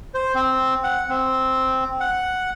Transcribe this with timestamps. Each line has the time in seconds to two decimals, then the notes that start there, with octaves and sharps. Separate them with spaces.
0.14 C5
0.35 C4
0.83 F#5
1.09 C4
2.00 F#5